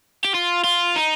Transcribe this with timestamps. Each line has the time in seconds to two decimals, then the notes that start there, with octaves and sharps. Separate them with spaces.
0.24 G4
0.34 F4
0.64 F4
0.96 D#4